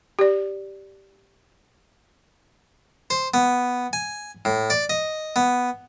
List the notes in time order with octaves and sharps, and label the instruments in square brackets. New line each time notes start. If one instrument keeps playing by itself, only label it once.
[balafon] G4 D5
[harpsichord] C5
B3
G#5
A2
D5
D#5
B3